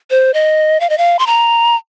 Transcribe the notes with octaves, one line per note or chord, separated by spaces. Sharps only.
C5
D#5
F5
D#5
F5
C6
A#5